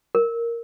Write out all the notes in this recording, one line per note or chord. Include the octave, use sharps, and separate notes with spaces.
A#4